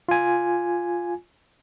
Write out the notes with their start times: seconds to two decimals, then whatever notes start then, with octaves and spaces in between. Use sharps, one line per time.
0.09 F4 G#5